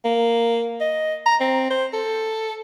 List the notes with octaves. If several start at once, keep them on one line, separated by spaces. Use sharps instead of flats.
A#3
D#5
A#5
C4
C5
A4